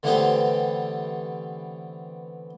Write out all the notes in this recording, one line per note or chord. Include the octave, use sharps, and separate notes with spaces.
D3 E3 A3 B3 C4 G4